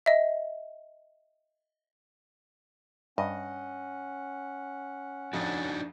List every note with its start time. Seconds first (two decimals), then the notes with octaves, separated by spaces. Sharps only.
0.06 D#5 E5
3.18 G2 C#4 D#5 F#5
5.33 F2 D4 D#4 F#4